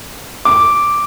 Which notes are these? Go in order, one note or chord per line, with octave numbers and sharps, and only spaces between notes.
D6